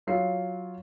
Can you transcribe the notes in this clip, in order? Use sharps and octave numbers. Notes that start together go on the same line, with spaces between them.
F#3 F4 C7